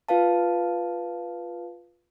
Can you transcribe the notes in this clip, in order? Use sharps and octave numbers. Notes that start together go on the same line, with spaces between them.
F4 B4 F5 A5